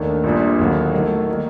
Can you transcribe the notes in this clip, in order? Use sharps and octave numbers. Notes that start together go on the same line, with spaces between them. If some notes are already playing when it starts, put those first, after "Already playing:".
Already playing: D#2 D#3 A3 D4
A#1 A#2 G3 D4
D#2 D3 F#3 C4 F#4
D#3 F#3 A3
D#3 G3 A#3